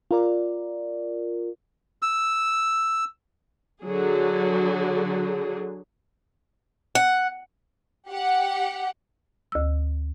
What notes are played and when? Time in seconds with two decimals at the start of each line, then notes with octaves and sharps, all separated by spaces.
0.11 F4 A#4 D5
2.02 E6
3.83 D3 F#3 G#4
6.95 F#5
8.10 G4 F#5
9.52 D2 E6